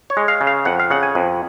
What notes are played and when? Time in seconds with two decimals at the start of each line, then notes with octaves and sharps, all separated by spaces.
0.10 C#5
0.17 G#3
0.28 F5
0.41 C#3
0.47 F5
0.65 F2 F#5
0.80 F5
0.90 C#3 F#5
1.03 G#5
1.15 F2